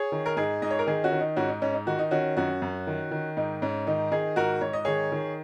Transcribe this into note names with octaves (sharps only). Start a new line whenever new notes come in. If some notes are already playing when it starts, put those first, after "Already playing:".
Already playing: G#4 C#5
D#3
A#4
G#2 D#4 G#4
G#2 D#5
C#5
A#4
D#3 D#4 G#4
C#4 F#4
D#3
D#4
G#2 C#4 F#4
D#4
G#2 C#4
D#4
D#3 F#4
D#4
D#3 C#4 F#4
F#2 C#4 F#4
F#2
D#3
D#3
G#2 D#4
G#2 C#4
D#3 D#4
D#3 D#4 G#4
G#2 F#4 A#4
G#2 C#5
D#5
D#3 G#4 C#5
D#3